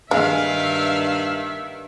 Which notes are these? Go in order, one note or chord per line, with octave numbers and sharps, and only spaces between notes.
G2 D#3 G#3 E5 F5